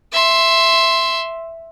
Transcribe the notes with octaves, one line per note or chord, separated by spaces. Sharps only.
E5 C6